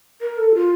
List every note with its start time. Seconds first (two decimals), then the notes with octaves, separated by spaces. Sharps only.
0.21 A#4
0.38 A4
0.55 F4